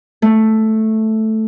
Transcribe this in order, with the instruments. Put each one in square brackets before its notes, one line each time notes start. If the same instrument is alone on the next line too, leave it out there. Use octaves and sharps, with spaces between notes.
[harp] A3